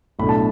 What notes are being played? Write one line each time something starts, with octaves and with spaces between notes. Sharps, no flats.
B1 A2 A3 D4 B5
A5